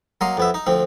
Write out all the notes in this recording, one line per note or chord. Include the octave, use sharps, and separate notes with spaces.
F#3 A#3 D#5 C6
F2 B3 E5
D#4
D2 F3 C4